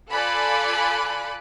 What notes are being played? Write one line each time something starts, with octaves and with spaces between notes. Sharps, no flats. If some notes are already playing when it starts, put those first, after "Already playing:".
F4 A4 D5 G#5 B5 F#6